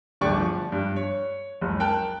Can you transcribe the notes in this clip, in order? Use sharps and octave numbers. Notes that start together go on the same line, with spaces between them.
D1 G1 D3 D5 G5 C#6
F3
G2
C#5
F#1 C#2
A#4 G5 A5 F#6